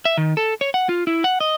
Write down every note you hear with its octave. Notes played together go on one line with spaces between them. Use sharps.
E5
D#3
A4
C#5
F#5
F4
E4
F#5
D#5